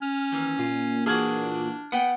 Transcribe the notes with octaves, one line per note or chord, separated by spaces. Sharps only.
C#4 F6
D#2 D#3 E3
A#2 F4
E3 A#3 D4 F#4 G#4 F6 G#6
B3 F#5 G5